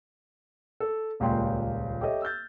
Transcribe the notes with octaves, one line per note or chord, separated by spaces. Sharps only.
A4
D#1 C#2 A#2 G5 C6
G4 A4 C#5 D#5 E5
E6 F6 G6 A6